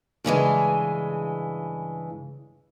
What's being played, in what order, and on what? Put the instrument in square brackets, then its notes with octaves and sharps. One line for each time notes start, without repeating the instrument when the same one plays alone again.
[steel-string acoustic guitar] G2 C#3 E3 G#3